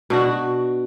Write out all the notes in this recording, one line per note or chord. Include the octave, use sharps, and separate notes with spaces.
B2 D4 F#4